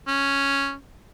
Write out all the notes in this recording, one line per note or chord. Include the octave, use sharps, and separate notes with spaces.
C#4